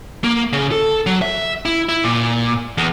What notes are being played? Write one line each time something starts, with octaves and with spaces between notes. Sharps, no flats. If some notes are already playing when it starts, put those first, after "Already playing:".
A#3
C#3
A4
F#3
E5
E4
E4
A#2
E2